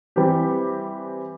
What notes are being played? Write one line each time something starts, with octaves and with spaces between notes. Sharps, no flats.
E3 G3 C4 G4